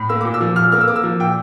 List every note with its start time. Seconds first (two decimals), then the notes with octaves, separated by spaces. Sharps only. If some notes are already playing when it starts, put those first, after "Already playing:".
Already playing: A2
0.09 A#3 E6
0.21 A#2 D6
0.34 E6
0.41 F3
0.56 A#2 F6
0.72 A#3 F6
0.81 E6
0.88 A#3 D6
0.96 E6
1.04 F3
1.20 A#2 G5